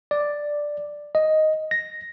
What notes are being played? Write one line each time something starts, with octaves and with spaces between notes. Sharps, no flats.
D5
D#5
A#6